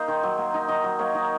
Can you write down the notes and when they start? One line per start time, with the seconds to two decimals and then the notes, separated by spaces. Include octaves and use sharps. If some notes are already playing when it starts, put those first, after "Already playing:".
Already playing: A#3 D#4 C5
0.08 D#3
0.23 F#3
0.38 A#3
0.54 D#4
0.68 D#3 D#5
0.84 F#3
0.99 A#3 C#5
1.15 D#4